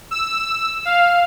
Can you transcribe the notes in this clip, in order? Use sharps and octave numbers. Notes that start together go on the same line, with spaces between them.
E6
F5